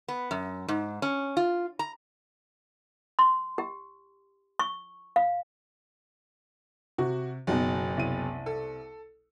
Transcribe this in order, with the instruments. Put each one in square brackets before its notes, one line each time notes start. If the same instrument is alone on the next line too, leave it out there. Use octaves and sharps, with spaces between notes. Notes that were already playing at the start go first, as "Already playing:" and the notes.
[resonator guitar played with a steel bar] B3
F#2
G#2
C#4
F4
A#5
[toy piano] C6
G4
C#6
F5
[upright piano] C3 [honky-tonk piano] F#4
[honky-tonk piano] F#1 B2 [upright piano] D#4 F#4
[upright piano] C2 D#7
[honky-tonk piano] A4